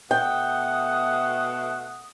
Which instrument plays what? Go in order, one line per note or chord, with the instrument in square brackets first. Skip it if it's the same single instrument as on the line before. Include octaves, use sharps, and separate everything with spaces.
[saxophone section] B2 A3 [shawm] F#5 [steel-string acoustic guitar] G5 [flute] D#6